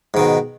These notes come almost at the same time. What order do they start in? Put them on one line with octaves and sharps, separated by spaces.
G#2 D#3 B2